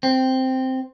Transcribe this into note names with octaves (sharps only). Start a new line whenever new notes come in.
C4